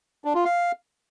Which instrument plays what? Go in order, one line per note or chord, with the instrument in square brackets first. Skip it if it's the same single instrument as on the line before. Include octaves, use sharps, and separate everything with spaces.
[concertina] D4
F4
F5